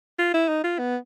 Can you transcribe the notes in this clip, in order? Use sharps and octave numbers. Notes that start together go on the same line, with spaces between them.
F4
E4
D#4
F4
B3